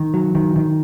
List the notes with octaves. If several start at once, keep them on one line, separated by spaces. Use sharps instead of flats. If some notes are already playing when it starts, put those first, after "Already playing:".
Already playing: D#3
F#3
D#3
D#3